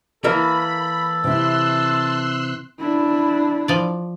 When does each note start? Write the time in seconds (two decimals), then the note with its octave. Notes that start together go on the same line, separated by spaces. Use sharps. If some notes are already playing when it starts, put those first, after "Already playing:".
0.24 E3 A#3 A4 A#4 B5
1.24 C3 E4 C6 E6 F#6
2.80 D4 E4
3.68 F3 D5